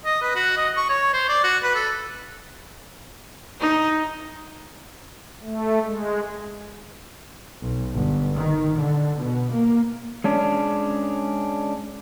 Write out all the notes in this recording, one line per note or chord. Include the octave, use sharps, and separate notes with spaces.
D#5
B4
F#4
D#5
C#6
C#5
C5
D5
F#4
B4
A4
D#4
A3
G#3
B1
G1
D#3
D3
B2
A#3
G#3 C#4 D4